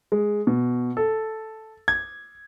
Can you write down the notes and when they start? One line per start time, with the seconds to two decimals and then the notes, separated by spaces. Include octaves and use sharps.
0.12 G#3
0.47 B2
0.97 A4
1.88 G#6